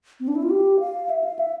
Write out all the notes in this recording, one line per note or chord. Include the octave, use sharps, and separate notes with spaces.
C4
D4
E4
F4
G4
F5
E5
F5
E5